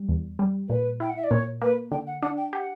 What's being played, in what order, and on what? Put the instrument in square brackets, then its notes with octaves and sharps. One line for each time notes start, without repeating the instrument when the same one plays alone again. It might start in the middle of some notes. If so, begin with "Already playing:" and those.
Already playing: [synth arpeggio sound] G3
E2
G3
[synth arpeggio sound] A#2 [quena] B4
[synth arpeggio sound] E4 [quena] G5
[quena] F#5
E5
D5
[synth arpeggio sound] A#2 [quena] C#5
[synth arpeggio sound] A#3 [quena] B4
[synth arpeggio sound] D3 [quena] G5
[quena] F#5
[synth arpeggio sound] D4 [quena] F#5
[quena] G5
[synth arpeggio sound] G4 [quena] F#5